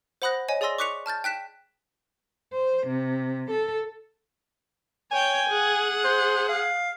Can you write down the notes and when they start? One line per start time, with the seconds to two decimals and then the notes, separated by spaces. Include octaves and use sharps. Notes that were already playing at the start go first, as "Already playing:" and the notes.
0.22 C5 F#5 B5 D#6 F#6 A#6
0.48 C#5 D#5 G#5
0.61 G#4 D5 G#5 C6 E6 A#6
0.78 C#6 D6 F#6 B6 C#7 F7
1.06 A5 F6 G6 A6
1.24 G5 F#6 B6 E7
2.53 C5
2.87 C3
3.50 A4
5.12 C#5 G5 G#5
5.49 G#4 F#5
6.04 C5
6.49 F5